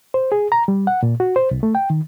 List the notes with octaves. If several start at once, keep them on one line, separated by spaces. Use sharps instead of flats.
C5
G#4
A#5
G3
F#5
A#2
F#4
C5
C2
A3
G5
D#3